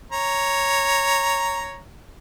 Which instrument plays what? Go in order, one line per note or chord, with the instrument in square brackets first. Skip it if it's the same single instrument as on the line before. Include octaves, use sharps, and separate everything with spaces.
[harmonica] C#5 A#5